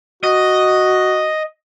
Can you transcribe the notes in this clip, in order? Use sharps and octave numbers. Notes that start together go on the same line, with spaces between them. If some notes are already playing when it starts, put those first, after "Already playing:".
F#4 D#5